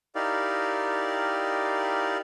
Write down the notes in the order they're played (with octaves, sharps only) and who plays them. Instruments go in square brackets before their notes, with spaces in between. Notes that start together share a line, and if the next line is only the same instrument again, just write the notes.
[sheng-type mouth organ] D#4 E4 G4 A#4 D5 F5